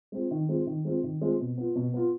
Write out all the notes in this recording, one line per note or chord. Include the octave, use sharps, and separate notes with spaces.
G#3 C4 F4
D#3
G#3 C4 F4
D#3
G#3 C4 F4
D#3
G#3 C4 F4
B2
B3 F4
B2
B3 F4